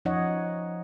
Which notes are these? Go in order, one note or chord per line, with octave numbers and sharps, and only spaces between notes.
F3 C#4 D#4 C#5 D#5 F#5